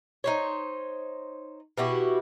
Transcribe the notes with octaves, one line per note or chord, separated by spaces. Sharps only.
D#4 C5 C#5
B2 E4 F#4 G4